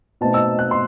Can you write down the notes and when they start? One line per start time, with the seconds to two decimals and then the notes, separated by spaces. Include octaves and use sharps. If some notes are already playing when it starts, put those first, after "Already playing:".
0.21 B2 A3 C4 D#4 A5
0.34 E6
0.59 F#6
0.71 C6